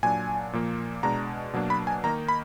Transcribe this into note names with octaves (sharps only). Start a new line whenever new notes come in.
A#2 F#3 D4 G#5
A#2 F3 A#3
B2 G#3 D4 A#5
B2 F#3 A#3 D4
B5
G#5
D#3 A#3 D#4 A#5
B5